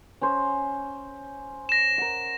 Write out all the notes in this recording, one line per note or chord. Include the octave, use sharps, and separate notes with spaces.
C#4 C5
A#6 E7
A#4 F#5